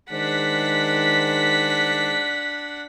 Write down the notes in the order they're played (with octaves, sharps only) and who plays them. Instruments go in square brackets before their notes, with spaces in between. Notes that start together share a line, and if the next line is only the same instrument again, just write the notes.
[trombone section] D#3 G#3 C5 [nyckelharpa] D4 F#5 [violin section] B6